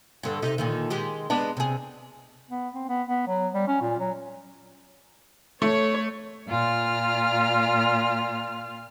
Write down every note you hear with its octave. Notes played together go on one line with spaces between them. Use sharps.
G2 D3
C3 D#4 G4
A#2 D3 D#3
D#3 G#3 G4
G#3 B3 D4
C3 G#4
B3
C4
B3
B3
F#3
G3
C#4
A#2
F#3
A3 C#5
A#2 F4 F6